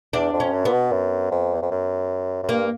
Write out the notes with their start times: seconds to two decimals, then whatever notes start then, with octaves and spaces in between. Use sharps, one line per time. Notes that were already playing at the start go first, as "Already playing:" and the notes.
0.13 E2 D4
0.33 F2
0.40 C#4
0.53 F#2
0.65 A#2 B3
0.73 B2
0.92 F#2
1.31 F2
1.54 E2
1.62 F2
1.71 F#2
2.43 F#2
2.49 G2 A#3